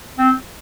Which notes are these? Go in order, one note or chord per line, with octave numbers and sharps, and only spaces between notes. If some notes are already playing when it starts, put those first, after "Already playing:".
C4